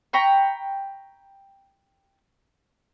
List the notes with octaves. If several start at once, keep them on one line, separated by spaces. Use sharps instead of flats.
G5 A#5 B5 C#6